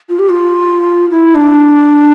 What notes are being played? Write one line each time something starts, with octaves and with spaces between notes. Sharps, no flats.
F4
G4
F4
E4
D4